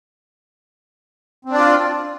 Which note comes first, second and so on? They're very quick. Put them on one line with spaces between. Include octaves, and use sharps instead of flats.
C4 D4 D5 F4